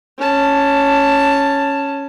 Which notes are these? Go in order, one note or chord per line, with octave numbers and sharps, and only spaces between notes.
C#4 A5